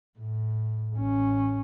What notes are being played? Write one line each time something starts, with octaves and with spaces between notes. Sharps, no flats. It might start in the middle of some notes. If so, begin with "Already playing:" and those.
A2
A1 C#4